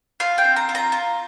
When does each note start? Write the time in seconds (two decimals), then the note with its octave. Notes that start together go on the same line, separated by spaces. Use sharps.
0.20 F4 F5
0.38 G5
0.44 C4
0.56 A#5
0.69 F4
0.75 A#5
0.92 F4